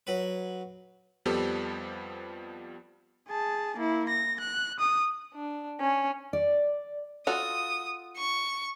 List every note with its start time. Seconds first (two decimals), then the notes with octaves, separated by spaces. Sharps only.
0.07 F#3 B4
1.25 F2 F3 G3 B3 G4 A4
3.28 G#4 A5
3.77 A#3 E4
4.09 A#6
4.40 F#6
4.79 D#6
5.34 D4
5.80 C#4
6.33 D5
7.27 F4 F#4 A4 D#6
8.18 C#6